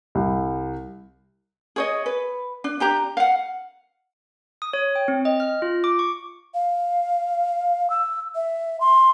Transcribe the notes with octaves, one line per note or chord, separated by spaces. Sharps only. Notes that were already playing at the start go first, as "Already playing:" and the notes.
C2
G#4 C#5 D#5
B4
D4
D4 G4 A#5
F5 F#5
D#6
C#5
G5
C4
D#5
F6
F4
D6
C#6
F5
E6
E5
C6